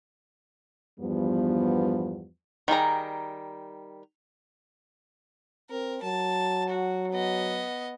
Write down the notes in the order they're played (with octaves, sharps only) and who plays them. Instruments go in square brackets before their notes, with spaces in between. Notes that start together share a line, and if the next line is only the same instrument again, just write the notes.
[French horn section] E2 G2 F3 G3 B3
[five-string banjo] D#3 G3 G#4 A#5
[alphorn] C4 [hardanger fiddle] A#4
[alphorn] F#3 [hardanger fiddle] A5
[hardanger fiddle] F#4
B3 D#5